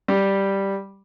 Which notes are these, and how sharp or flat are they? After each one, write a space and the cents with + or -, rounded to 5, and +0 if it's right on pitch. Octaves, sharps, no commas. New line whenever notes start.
G3 +0